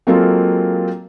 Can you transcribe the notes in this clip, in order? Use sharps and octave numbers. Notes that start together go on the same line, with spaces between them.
F#3 G#3 A#3 C4 F4 A4